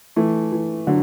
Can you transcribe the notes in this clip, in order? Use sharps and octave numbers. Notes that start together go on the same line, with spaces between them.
E3 A3
E3
D3 F#3